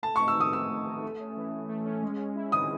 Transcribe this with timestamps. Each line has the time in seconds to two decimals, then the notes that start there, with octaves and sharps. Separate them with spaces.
0.03 A3 A5
0.16 D#4 C#6
0.28 E6
0.37 D#3 D#6
0.53 D#3 E6
0.69 A3
0.87 D#4
1.02 A3
1.19 C#4
1.37 E3
1.53 E3
1.69 A3
1.86 C#4
2.02 G#3
2.19 C#4
2.35 E4
2.52 D#3 D#6